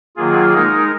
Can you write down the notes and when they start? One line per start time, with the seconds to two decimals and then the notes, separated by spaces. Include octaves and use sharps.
0.17 D#3 F#3 A#3 F4 G#4
0.54 G#3 D#4 A#4